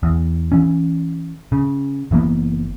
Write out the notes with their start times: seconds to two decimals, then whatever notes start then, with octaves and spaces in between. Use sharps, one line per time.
0.03 E2
0.52 E3 C#4
1.52 C#3
2.11 F#1 E3 A#3 B3